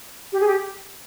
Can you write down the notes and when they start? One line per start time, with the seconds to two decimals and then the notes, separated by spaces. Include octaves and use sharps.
0.32 G4
0.41 G#4
0.47 G4